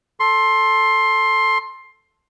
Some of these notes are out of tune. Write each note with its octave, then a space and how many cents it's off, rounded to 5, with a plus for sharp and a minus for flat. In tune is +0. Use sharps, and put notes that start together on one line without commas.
A4 +0 C6 +15